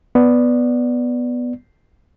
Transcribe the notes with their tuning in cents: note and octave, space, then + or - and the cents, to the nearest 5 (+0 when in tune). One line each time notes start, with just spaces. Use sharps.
B3 +0 D5 +0